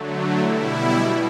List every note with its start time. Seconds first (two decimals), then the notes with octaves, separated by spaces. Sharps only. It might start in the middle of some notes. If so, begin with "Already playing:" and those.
Already playing: D3 F#3 A3
0.40 B2 G3 E4
0.97 B2